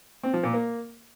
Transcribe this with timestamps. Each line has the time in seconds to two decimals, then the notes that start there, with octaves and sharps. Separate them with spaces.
0.23 C4
0.33 F3
0.44 A#2
0.54 A#3